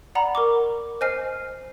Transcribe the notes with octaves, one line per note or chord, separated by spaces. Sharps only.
D5 F#5 A#5 B5
A#4 C#6 D6
C5 D#5 G#5 F6 C7